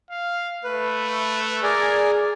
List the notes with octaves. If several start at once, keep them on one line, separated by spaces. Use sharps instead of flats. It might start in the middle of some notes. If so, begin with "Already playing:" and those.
F5
A3 B4
G#4 A#4 D5 G#5